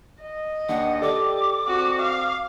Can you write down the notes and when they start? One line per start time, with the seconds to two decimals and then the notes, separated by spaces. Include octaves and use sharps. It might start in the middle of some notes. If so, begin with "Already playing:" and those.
0.23 D#5
0.69 D#2 D4 F#5
1.02 G4 A4 D5 D6
1.68 C4 F#4
2.02 F5